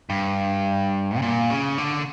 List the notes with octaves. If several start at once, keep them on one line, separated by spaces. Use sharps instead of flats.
G2
C#3
A#2
C#3
D3